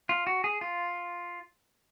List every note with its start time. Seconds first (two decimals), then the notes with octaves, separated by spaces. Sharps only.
0.09 F4
0.27 F#4
0.44 G#4
0.61 F4